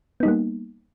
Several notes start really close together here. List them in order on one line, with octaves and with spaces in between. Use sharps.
B3 D#4 G3 A#3